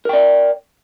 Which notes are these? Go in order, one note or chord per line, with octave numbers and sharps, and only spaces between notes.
A#4 D5 G5